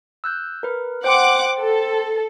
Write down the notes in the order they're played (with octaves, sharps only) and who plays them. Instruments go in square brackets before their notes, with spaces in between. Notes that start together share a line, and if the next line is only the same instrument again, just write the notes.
[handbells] E6 F#6 G6
A#4 B4
[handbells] C5 G5 C6 [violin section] F#5 D6
[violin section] A4